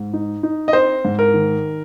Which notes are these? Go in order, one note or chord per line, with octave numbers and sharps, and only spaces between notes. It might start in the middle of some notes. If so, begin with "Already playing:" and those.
Already playing: G#2
D#4
D#4
D#5
C4 C5
G#2
A#4
D#3